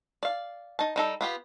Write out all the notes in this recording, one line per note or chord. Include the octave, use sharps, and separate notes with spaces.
D5 F5
D#4 A5
G3 D#4 A4
B3 F4 G4